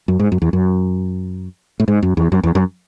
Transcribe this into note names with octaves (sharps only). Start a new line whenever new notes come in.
F#2
G#2
F#2
E2
F#2
A2
G#2
F#2
E2
F#2
E2
F#2